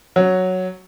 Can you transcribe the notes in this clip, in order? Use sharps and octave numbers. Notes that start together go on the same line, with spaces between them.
F#3